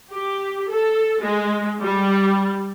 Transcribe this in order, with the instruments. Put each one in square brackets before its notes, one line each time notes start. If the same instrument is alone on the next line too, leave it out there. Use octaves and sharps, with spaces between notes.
[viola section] G4
A4
G#3
G3